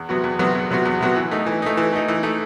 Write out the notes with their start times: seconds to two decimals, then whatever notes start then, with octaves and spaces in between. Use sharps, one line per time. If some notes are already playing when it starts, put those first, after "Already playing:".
Already playing: E2
0.09 C3 F#3 B3 F#4
0.24 E2
0.39 C3 F#3 B3 F#4
0.55 E2
0.70 C3 F#3 B3 F#4
0.85 E2
1.01 C3 F#3 B3 F#4
1.16 E3
1.31 A3 D#4
1.46 E3
1.62 A3 D#4
1.77 E3
1.93 A3 D#4
2.08 E3
2.23 A3 D#4